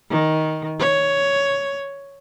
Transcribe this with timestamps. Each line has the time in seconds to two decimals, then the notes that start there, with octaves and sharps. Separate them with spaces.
0.11 D#3
0.80 C#5